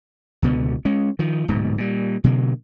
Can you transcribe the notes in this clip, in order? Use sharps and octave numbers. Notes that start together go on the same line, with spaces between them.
C#2 B2 D3 B3
G#3 C#4
D#3 F3
D1 G#2 B2
A#2 G3
B2 D3 F#3 A#3